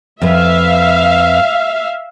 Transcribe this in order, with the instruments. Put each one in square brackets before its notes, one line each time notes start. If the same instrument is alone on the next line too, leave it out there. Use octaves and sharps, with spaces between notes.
[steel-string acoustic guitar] F2 B4 [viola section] E5 F5